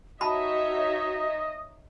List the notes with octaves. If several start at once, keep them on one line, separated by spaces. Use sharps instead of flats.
D#4 F#4 C#5 D#5 E5 A5 B5